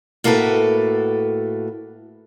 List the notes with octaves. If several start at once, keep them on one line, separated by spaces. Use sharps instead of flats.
A2 A#3 F#4 A4 B4